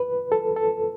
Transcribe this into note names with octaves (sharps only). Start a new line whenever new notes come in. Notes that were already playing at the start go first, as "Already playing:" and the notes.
Already playing: B4
A4
A4